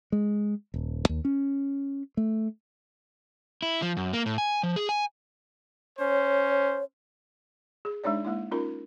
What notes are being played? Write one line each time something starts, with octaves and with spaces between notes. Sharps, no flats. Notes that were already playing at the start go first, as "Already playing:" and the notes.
G#3
D#1
D#2
C#4
A3
E4
F3
F#2
A#3
A2
G#5
F3
G#4
G#5
C#4 C5 C#5
G#4
G#3 D4 D#4 C#5 D5
G#3 A#3 E4
C#4 D#4 F4 A#4